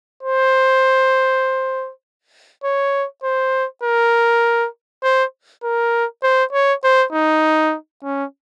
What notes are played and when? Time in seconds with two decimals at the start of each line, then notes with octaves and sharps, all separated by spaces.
0.23 C5
2.64 C#5
3.24 C5
3.83 A#4
5.03 C5
5.63 A#4
6.23 C5
6.53 C#5
6.84 C5
7.13 D#4
8.03 C#4